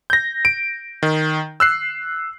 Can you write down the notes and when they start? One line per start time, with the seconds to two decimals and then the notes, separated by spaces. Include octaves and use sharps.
0.10 G6 A#6
0.45 D7
1.03 D#3
1.60 E6 F#6 C7